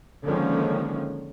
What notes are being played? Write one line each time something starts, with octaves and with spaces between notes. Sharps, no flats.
D3 D#3 F3 G#3 A#3 C#4